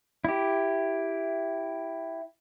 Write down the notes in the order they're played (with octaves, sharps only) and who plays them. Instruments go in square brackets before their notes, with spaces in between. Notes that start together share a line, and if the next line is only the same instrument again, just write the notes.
[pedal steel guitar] E4 G4